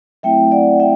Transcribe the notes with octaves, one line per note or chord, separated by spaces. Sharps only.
F#3 A3 C4 E4 E5 G5
D5 F#5
E5 G5